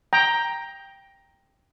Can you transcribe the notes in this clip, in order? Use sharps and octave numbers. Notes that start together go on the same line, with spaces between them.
G5 A#5